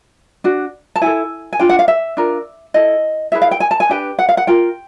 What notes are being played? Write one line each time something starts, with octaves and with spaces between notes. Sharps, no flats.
D4 F#4
A5
E4 A4 G#5
G#5
D4 F4 G5
F#5
F5
E5
D4 F4 A#4
E4 A4 D#5
E4 G#4 B4 E5
F5
G5
G#5
A5
G#5
D4 G4 B4 G5
F#5
F5
F#5
F4 A#4 G5